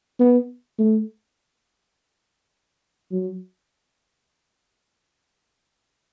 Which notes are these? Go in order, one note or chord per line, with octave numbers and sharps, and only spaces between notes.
B3
A3
F#3